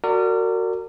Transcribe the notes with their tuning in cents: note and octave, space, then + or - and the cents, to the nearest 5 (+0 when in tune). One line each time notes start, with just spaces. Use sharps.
F#4 +0 A#4 -35 D5 +0